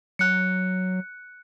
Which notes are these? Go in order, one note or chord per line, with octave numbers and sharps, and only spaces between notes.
F#3 F#6 C#7